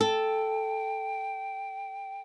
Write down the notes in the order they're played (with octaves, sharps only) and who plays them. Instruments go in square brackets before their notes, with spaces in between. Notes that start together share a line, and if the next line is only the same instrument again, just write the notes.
[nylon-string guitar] A4 [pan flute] G5